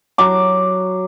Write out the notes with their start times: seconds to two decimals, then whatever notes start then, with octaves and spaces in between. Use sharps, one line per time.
0.18 F#3 D6